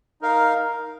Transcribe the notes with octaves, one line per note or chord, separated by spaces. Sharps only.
D#4 A#4 F5